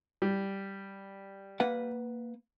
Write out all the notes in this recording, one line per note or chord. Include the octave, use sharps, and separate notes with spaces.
G3
A#3 B4 F#5